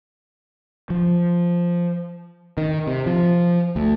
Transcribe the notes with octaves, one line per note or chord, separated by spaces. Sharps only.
F3
D#3
C3
F3
D2